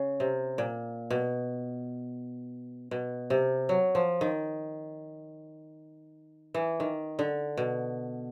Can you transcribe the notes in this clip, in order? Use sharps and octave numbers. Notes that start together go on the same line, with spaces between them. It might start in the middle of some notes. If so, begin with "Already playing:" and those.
Already playing: C#3
C3
A#2
B2
B2
C3
F#3
F3
D#3
E3
D#3
D3
B2